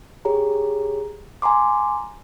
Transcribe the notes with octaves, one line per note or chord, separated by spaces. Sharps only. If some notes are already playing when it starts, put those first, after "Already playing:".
G4 G#4 C#5 A#5
G#5 A#5 C6 D6